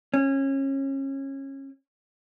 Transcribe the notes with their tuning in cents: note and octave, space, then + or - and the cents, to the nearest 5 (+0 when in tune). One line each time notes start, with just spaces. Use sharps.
C#4 -25